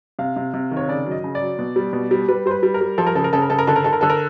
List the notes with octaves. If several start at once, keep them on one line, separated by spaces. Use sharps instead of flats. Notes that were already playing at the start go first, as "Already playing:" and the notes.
C3 F5
C3
C3
D#3
C#5
C#3 D5
F#3
D#5
C#3
D5
F#3
B2
G3
B2
G3
G3 B4
G3 C5
B4
G3
A#4
G3
F3 A4
A#4
C#3 A4
A#4
C#3 A4
A#4
C#3 A4
A#4
D3 A4
A#4
D3 A4
A#4
D3 A4
A#4